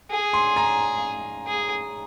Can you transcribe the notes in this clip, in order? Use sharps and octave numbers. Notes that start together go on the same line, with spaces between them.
G#4
C6
A#5
G#4